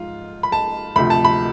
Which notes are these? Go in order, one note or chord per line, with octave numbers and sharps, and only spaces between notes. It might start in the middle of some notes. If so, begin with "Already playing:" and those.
Already playing: G#2 F3 F4
B5
A5
D2 C3 F3 B5
A5
B5